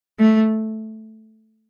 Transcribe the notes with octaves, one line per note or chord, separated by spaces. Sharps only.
A3